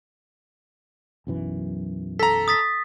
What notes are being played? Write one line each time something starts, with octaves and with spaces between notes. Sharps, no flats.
B1 F#2 E3
A4 A#5 B6
D#6 A6 B6